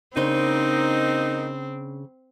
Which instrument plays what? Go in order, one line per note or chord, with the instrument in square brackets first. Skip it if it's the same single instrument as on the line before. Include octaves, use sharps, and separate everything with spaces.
[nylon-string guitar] C#3 D4 C5 [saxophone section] A#3 D#4 [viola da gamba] C4